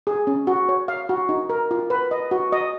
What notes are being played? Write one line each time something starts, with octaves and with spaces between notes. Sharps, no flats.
G#4
C#4
F#4
C#5
F5
F#4
D#4
A#4
F4
B4
D#5
F#4
D#5